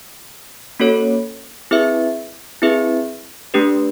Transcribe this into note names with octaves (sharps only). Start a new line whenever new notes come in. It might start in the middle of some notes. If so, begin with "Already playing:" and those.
A#3 C#4 F#4 A4 C#5
C4 E4 G#4 B4 E5
C4 E4 G#4 B4 E5
A3 D4 G4 B4